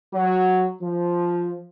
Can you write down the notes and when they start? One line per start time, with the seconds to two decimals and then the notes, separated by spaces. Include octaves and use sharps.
0.13 F#3
0.82 F3